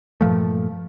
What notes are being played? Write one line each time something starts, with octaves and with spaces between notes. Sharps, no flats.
G2 A#2 F3 A3